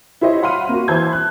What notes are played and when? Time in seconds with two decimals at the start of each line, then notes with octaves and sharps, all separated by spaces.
0.21 E4 G4 C5 C#5 D#5
0.42 F5 F#5 B5 C6 F6 D#7
0.69 A#3 F#4
0.88 E3 C5 A5 E6 G6 G#6
1.13 F#6